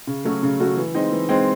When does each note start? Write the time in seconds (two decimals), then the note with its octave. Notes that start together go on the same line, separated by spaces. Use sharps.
0.07 C#3
0.25 F#3 A3 C#4 F#4
0.43 C#3
0.60 F#3 A3 C#4 F#4
0.77 E3
0.94 G#3 C4 D#4
1.12 E3
1.29 G#3 C4 D#4